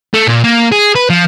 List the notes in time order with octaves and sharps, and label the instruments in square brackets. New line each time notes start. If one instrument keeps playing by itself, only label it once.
[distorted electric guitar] A3
A#2
A#3
G#4
B4
F3